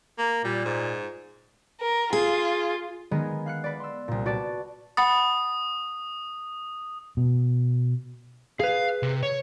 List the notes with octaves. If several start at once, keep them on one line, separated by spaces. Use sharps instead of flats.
A#3
A#2 G3
G#2
A#4
F4 G#4
D#3 G#3 B3 G#4 A#4
F5 F#6 C#7
B4 D5
C6 E6
C2 A#2
F#4 B4 D5 A5
F#5 B5 D#6 A6
B2
G#4 B4 F5
C3
C#5